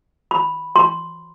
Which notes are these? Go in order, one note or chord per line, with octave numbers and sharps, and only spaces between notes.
B5
C6